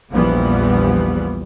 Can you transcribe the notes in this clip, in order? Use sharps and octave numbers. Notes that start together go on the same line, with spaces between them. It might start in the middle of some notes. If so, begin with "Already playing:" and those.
A#1 E2 E3 F3 G3 B3